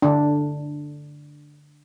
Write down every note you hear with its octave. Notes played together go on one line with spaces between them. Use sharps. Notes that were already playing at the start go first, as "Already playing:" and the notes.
D3 D4